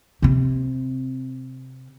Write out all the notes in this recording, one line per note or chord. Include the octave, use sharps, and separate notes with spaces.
C3 C4